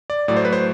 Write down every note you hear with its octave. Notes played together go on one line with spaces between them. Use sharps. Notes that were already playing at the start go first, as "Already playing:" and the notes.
D5
A2 F#3 A3 D5
C5
B4
C5